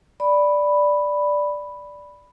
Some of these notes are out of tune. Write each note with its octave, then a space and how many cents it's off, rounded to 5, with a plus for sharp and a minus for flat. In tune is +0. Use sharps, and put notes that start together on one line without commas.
D5 +0 B5 +0